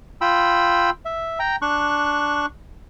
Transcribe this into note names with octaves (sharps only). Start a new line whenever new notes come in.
F4 G5 B5 E6
E5
G5 A#5
D4 C#6 F#6